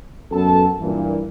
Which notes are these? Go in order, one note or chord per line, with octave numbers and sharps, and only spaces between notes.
F#2 B3 A4 A5
G2 A#2 E3